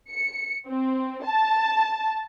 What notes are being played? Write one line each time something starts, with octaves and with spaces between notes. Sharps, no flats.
C#7
C4
A5